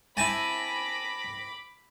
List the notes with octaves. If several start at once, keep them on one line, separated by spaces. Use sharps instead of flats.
C4 E4 G#5 A5 B5 D6 A#6